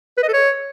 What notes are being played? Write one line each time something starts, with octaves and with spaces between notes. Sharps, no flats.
B4
D#5
A4
C#5